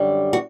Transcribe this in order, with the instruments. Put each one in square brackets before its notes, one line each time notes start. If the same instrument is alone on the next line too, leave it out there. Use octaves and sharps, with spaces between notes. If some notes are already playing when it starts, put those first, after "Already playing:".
Already playing: [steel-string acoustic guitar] F#2 D3 G3
F#4